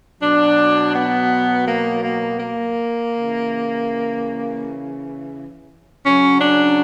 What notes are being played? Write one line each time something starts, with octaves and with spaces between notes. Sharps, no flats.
B2 F#3 D4
B3
A#3
A#3
A#3
C#3 E3
C#3 F#3 C#4
D4